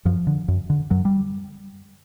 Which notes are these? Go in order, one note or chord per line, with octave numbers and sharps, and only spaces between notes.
F#2 F3
D3
F#2
D3
F#2 F#3
G3